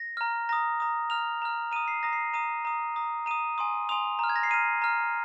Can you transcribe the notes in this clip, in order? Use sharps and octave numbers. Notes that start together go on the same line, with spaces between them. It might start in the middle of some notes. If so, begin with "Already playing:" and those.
Already playing: A#6
A#5 F6
A#5 D#6 A#6
A#5 D#6
A#5 F6 F7
A#5 F6
A#5 D#6 D#7
C7
A#5 D#6 A#6
C7
A#5 D#6 D#7
A#5 D#6
A#5 D#6
A#5 D#6 D#7
G#5 C6 D#6
G#5 C6 D#6 F7
A#5 F6
G#6
A#6
C7
A#5 F6 D#7
A#5 F6